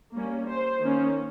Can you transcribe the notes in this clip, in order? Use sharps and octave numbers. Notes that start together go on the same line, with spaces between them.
G3 A#3 C#4
C5
D#3 A#3 C#4